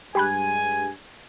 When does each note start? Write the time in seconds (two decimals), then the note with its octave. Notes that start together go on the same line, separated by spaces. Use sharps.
0.15 G2 G#3 G4 G#5 B5 F#6